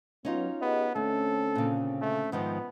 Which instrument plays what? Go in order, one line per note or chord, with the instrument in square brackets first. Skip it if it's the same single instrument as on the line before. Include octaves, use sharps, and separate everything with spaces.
[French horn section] F#3 B3 [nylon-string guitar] C#4 D#4 F4
[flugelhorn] B3 [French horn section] G4 G#4 D#5
[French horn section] D3 C4 C#4 [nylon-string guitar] A3 [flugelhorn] A4
[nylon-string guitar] A#2 C#3
[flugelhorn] A3
[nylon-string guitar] G#2 D#3 F3 [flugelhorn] B3